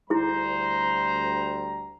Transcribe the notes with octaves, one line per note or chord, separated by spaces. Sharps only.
D2 G3 E4 G#4 C5 A#5